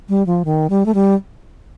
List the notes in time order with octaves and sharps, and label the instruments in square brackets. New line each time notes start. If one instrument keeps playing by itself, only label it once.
[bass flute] G3
F3
D#3
G3
A3
G3